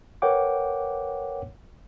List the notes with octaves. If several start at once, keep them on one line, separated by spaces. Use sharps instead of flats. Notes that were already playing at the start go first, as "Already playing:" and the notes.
A#4 B4 C#5 F#5 G5 D6